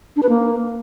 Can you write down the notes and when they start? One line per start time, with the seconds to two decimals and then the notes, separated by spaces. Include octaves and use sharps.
0.16 D4
0.23 B4
0.29 A#3